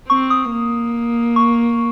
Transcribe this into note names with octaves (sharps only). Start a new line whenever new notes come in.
C4 C#6
D#6
A#3
C#6